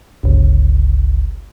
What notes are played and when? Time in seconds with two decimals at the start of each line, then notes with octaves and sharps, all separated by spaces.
0.23 G1 C#2